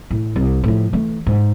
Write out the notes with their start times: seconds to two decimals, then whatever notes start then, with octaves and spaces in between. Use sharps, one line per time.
0.10 A2
0.36 C2
0.64 A2 F3
0.93 E3 A3
1.26 G#2